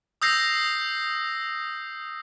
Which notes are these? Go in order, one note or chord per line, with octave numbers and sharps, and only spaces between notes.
D#6 E6 G6 A#6 C7